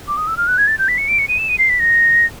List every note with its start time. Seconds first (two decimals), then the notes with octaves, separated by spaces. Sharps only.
0.08 D6
0.17 D#6
0.28 E6
0.37 F6
0.48 F#6
0.58 G#6
0.67 A6
0.79 G6
0.88 B6
0.98 C#7
1.08 D7
1.19 C#7
1.28 D#7
1.38 E7
1.49 D#7
1.58 C7
1.69 B6
1.79 A#6